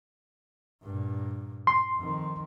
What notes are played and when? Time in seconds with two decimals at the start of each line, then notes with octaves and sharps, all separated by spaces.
0.83 G2 A#2
1.67 C6
1.97 F2 D#3